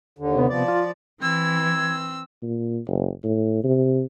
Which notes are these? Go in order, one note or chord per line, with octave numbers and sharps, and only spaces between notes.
D#2 D3
C3 B3
F3 D5
F4
E3 C4 E6 G#6
A#2
F#1
A2
C3